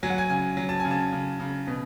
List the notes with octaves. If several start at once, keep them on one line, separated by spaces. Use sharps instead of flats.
F#3 G#5
F#5
G#5
C#3 G#5
F#3
A5
C#3 G#5
A5
C#3
C#3
B2